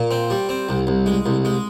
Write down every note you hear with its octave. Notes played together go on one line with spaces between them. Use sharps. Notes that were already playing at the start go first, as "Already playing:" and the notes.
Already playing: A#2
C4
G3
C4
C2
C2
G#3
C2
G#3